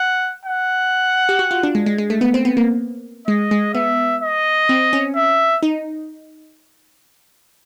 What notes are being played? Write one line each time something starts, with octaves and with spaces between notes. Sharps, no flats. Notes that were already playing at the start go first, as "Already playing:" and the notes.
Already playing: F#5
F#5
G4
F#4
F4
D4
G#3
G#3
G#3
A3
B3
C4
B3
A#3
G#3 D#5
G#3
B3 E5
D#5
C4
C#4
E5
D#4